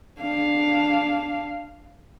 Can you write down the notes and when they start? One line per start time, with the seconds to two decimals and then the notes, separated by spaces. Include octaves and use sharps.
0.20 D4 F5